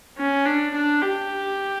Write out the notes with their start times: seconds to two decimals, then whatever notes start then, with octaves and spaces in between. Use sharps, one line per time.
0.17 C#4
0.45 D4
0.74 D4
1.01 G4